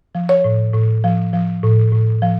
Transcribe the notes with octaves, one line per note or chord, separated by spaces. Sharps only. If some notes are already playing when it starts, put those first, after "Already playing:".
F3
C#5
A2
A2
F3
F3
A2
A2
F3